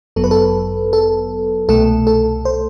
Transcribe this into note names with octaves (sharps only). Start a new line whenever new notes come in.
G1 F#2 F#3 B3 A4
B4
A4
A4
C2 B2 A3 A4
A4
C5